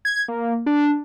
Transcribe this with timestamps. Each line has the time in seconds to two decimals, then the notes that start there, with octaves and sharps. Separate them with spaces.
0.05 G#6
0.28 A#3
0.66 D4